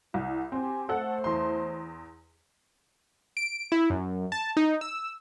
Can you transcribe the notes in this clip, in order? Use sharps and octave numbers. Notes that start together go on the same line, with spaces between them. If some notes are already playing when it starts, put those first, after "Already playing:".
C2 E4
C4 G4 G#5
A3 A4 C5 F#5
E2 C6
D7
E4
F#2
A5
D#4
E6